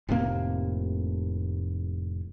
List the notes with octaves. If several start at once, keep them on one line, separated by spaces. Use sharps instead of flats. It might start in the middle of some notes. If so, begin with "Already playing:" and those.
F1 A2 C3 A#3